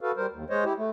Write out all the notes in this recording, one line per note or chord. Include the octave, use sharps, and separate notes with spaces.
F#4 A4 B4 F5
G3 A#4 C5
D#2
G#3 C5 C#5 D#5
E4 G4
A3